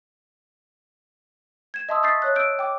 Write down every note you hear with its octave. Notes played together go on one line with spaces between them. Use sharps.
G#6 E7
D#5 E5 A5 C6 D#6 E6
C#6 D#6 G6 A6 B6 C7
C#5 F#6
E6 G6 D7
G5 D6